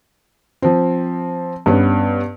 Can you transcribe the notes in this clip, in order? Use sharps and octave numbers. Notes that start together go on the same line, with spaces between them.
F3 C4
G2 B3 C#4